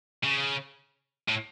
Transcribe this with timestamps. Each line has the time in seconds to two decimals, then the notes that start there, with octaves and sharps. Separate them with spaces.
0.24 C#3
1.28 A2